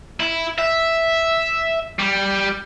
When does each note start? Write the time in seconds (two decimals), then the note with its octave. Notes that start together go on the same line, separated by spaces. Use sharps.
0.20 E4
0.58 E5
1.99 G3